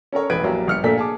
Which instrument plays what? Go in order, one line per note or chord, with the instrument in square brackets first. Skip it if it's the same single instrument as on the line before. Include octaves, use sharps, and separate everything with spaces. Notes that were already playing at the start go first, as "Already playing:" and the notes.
[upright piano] C#4 A4 A#4 C#5
E1 A1 B4 G#6 D7
A#1 F#3 A#3 G4
G1 F6 C#7
A#2 A3 A#3 D4 A4 B6
G#4 A5 D6